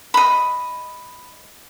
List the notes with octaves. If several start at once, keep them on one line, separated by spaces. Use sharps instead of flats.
D#5 B5